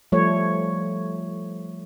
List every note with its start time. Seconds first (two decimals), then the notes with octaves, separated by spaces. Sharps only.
0.12 F3 G3 A3 C#5